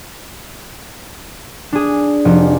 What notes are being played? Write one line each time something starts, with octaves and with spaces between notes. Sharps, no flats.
D4 G#4
F1